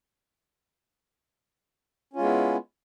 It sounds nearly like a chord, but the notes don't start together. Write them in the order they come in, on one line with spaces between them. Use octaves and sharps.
C#4 F4 G#3 B3 E4